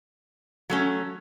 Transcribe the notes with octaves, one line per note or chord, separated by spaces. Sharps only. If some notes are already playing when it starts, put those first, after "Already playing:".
F#3 A3 C#4